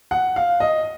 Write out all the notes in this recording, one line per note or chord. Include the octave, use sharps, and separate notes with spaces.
F#5
F5
D#5